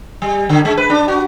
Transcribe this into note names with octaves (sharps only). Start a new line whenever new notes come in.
G3
D3
G#3
B4
D4
F#4